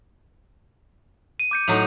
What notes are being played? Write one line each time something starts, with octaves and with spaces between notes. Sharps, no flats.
D#7
D6 G6 C#7
A2 F#3 D#4 F7